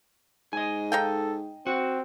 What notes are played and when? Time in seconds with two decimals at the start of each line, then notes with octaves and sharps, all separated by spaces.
0.53 G#2 D#5 G#5
0.92 D#4 A4 F5 G5
1.67 C4 F#4